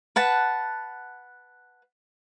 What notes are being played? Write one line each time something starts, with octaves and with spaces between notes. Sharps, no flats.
B4 F#5 A5